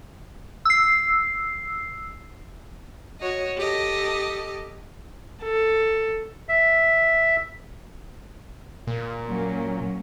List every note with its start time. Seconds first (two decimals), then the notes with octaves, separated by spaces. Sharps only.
0.65 E6 C7
3.20 F#4 C#5 D#5
3.57 G4 A4 D#5
5.42 A4
6.49 E5
8.87 A#2
9.28 F#3 A#3 C#4